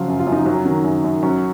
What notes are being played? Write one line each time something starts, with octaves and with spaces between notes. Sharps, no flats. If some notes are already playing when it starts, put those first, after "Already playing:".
Already playing: C#3 F3 F#3 F4
F#2
F4
F#2
D#4
F#3 C#4
D#3
F#2
F#2
F#3 C#4